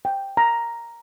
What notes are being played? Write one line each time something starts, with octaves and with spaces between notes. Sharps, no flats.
G5
A#5